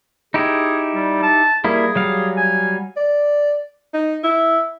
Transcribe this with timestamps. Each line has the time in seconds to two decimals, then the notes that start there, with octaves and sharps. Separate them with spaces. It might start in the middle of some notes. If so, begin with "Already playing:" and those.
0.34 D#4 E4 G4 G#4
0.94 G3
1.22 A5
1.64 G3 A#3 E4 G#4
1.95 F#3 G3 F5
2.37 G#5
2.97 D5
3.94 D#4
4.23 E4